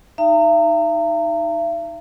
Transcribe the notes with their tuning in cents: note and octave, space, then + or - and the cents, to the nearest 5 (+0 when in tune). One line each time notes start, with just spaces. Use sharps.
D#4 +0 E5 +45 A#5 -35